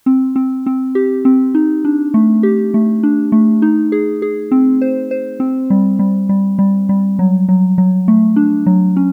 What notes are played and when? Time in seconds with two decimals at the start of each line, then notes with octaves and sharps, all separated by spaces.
0.06 C4
0.36 C4
0.66 C4
0.95 G4
1.25 C4
1.55 D#4
1.85 D4
2.14 A3
2.43 G4
2.74 A3
3.03 D4
3.32 A3
3.62 D#4
3.92 G#4
4.22 G#4
4.51 C4
4.81 C5
5.11 C5
5.40 C4
5.70 G3
5.99 G3
6.29 G3
6.59 G3
6.89 G3
7.19 F#3
7.49 F#3
7.78 F#3
8.08 A3
8.36 D4
8.66 F#3
8.96 C#4